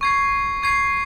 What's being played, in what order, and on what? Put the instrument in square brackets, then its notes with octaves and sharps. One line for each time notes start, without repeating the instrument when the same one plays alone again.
[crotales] C#6 G#6 C7
C#6 G#6 C7